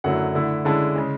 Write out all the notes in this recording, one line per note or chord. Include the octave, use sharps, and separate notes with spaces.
F#2 D3 F#3 A3 E4 F#5
D3 A3 E4
D3 G#3 C#4 E4 A5
C#3 G#3